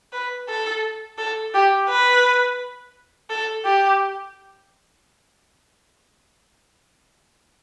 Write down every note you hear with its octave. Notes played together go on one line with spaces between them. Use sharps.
B4
A4
A4
G4
B4
A4
G4